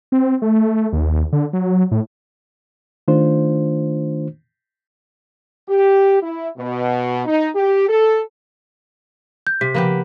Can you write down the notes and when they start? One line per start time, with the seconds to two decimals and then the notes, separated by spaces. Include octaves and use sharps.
0.12 C4
0.42 A3
0.56 A3
0.93 D#2
1.33 D3
1.53 F#3
1.91 A2
3.08 D#3 A3 D4 F4 C5
5.68 G4
6.22 E4
6.57 B2
7.26 D#4
7.54 G4
7.88 A4
9.47 G6
9.61 C3 B6
9.74 C#3 F3 A#3 B3 G4